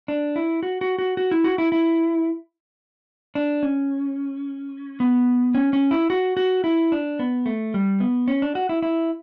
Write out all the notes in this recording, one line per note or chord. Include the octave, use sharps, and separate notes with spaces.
D4
E4
F#4
F#4
F#4
F#4
E4
F#4
E4
E4
D4
C#4
B3
C#4
C#4
E4
F#4
F#4
E4
D4
B3
A3
G3
B3
C#4
D4
F#4
E4
E4